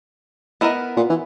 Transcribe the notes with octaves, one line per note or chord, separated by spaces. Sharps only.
B3 E4 A#4 D#5
A#2
E3